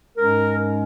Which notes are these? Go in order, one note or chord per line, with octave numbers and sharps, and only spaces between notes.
G#2 G#3 C#4 A#4